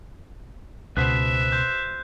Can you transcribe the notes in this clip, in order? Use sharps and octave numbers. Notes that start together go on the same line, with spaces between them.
C#2 B2 C5 E5 B5 F#6
C6 G6